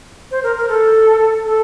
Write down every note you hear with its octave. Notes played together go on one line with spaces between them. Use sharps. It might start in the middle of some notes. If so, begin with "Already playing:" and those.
C5
A#4
A#4
A4
A4